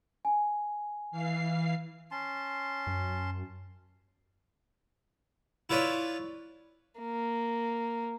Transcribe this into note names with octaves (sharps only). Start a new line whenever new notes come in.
G#5
E3 F5 C7
C#4 A5 C6
F#2
E4 F4 B4 C#5 D5
A#3